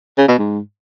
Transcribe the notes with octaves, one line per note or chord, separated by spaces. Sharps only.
C#3
B2
G#2